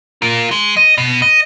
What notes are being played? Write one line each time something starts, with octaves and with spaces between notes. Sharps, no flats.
F4 A#4
G#3
D#5
B2
D#5